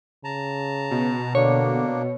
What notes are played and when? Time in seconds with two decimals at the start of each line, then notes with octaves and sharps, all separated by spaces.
0.24 C#3 A5 A#5
0.91 B2
1.35 D3 A#3 D4 C#5